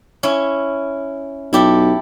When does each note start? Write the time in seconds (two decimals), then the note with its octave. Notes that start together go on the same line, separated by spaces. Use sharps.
0.23 C#4 E4
1.53 B1 E4 G4 A4